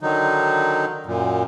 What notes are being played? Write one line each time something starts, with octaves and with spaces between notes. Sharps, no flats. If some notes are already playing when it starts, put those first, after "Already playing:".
D3 D#3 F#3 D#4
F#2 A#2